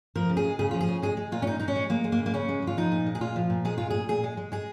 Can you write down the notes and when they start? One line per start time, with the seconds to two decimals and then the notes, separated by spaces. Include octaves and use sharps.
0.16 F3 A#4
0.30 C#3
0.37 G#4
0.44 G#3
0.59 C#3 G#4
0.71 F3 F4
0.81 G#4
0.88 C#3
1.02 G#3 G#4
1.17 G#3
1.32 A#2 F4
1.42 C#4
1.47 A#2 D#4
1.60 G#3 D#4
1.68 C#4
1.76 G#3
1.90 G#3 A#3
2.04 G#3
2.12 A#3
2.19 C#3
2.26 A#3
2.34 C#3 C#4
2.49 G#3
2.62 G#3
2.67 F4
2.77 F3 D#4
2.92 A#2
3.06 G#3
3.15 G#4
3.21 A#2 F4
3.36 F3
3.50 A#2
3.65 G#3 G#4
3.78 G#3 F4
3.90 A#2 G#4
4.08 A#2 G#4
4.24 G#3
4.37 G#3
4.52 G#3 G#4